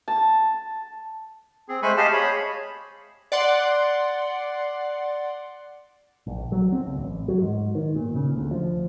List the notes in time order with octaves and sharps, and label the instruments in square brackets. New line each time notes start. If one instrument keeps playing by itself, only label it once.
[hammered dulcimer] A5
[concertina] C4 G#4
G#3 A3 C5 G#5 B5 C#6
G4 G#4 D#5 F5 G#5 A5
G#4 C#5 B5
[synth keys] D5 F#5 C6
[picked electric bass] A#1
F#3
C4
C#2
A1
F#3
G#2
D#3
A#2
C#3
D2
F3